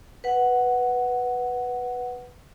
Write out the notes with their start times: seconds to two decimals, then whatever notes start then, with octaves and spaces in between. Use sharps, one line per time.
0.24 B4 F#5